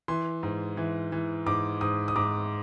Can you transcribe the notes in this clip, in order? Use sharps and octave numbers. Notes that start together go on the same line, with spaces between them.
E3 C6
G#2
E3
E3
G#2 D6
G#2 D#6
D#6
G#2 D6